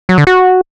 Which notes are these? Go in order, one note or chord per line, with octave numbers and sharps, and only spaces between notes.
F#3
D3
F#4